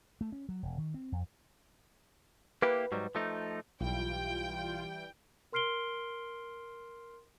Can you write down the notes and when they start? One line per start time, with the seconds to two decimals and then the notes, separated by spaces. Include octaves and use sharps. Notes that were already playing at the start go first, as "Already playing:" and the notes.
0.21 A3
0.32 C#4
0.49 F#3
0.63 E1
0.78 D#3
0.94 C4
1.12 F2
2.62 A#3 E4 G4 B4
2.92 G#2 F#3 G3
3.15 F3 A3 D#4
3.81 B1 E3 G3 F4 G5
5.52 A#4 C6 F6 C7 D7 G7